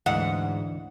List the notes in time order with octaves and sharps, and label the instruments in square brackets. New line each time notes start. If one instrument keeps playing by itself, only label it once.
[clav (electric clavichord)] D2 E3 [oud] G#2 [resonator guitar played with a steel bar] F#5